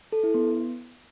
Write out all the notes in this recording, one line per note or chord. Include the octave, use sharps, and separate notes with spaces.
A4
E4
B3